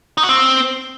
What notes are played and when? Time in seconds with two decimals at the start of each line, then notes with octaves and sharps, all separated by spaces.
0.18 D#4
0.23 F#4
0.29 C4